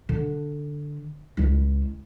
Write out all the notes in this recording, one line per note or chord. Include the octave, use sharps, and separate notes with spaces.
D3 D4
C#2 E4